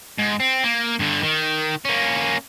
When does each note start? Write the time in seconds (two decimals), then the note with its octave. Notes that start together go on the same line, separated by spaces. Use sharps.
0.18 G#2
0.40 C4
0.64 A#3
0.99 G2 D3
1.23 D#3
1.85 A#3 C#4